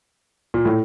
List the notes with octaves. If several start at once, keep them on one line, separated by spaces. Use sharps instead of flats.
A#2
A2